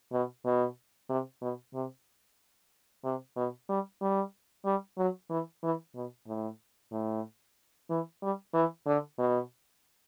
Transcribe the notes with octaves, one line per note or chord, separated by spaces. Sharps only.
B2
B2
C3
B2
C3
C3
B2
G3
G3
G3
F#3
E3
E3
B2
A2
A2
E3
G3
E3
D3
B2